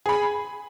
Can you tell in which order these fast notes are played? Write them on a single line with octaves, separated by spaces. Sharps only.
G#4 B5 G#5